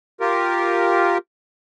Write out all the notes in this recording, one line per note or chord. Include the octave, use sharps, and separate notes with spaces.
F4 G4 A#4